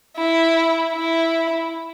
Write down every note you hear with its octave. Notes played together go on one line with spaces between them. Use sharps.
E4
E4